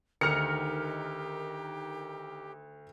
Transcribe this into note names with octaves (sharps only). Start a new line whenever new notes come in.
D2 D#3 G4 A#4 F6 C#7